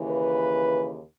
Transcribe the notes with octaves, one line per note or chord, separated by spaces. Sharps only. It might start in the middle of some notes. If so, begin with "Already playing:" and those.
Already playing: D#2 C#3 E3
B4